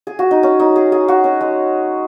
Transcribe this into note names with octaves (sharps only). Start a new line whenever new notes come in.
G#4
F#4
D#4
C#4
D#4
G#4
G#4
F#4
C#4
G#3